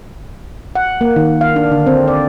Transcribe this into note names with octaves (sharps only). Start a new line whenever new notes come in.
F#5
A#3
D#3
F5
D4
D3
C4
D5